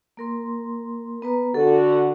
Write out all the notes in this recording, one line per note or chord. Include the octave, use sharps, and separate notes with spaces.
A#3 A#4 C6
B3 B4 A#5
D3 F#4 A4